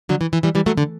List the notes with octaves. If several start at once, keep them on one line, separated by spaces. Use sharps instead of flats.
D3 F#3
E3
E3
E3 G3
E3 G3
F#3 A3
D3